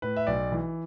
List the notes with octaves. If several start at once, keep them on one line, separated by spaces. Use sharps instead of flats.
A2 B4
E5
B1 D5
E3